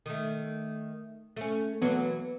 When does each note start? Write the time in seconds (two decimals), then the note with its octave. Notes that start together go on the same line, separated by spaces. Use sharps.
0.06 D#3 A3
1.37 A3 C#4
1.82 E3 F#3 A#3 B3